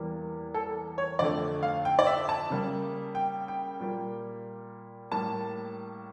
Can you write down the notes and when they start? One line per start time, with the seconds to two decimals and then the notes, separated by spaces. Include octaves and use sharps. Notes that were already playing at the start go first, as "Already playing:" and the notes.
Already playing: E2 E3 G3 A#3
0.54 A4
0.98 C#5
1.19 F2 D3 A3 D5
1.63 F5
1.85 G5
1.99 D5
2.07 E5
2.29 A5
2.50 C#3 G3 A#3
3.15 G5
3.48 G5
3.80 A#2 G3 A#3
5.12 A2 G3 A#3 A5